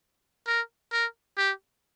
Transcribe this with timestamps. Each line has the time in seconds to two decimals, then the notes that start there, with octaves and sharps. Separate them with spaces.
0.47 A#4
0.92 A#4
1.37 G4